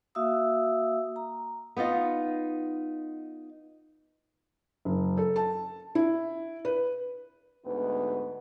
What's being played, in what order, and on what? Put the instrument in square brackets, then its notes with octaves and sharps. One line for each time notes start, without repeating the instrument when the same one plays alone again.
[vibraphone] A#3 F#4 E5 F5 D#6 E6
A#5
[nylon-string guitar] B3 D#4 F4 D#5
[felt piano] F#1
A4
A5
E4
B4
[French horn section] D2 G#2 B3 D#4 B4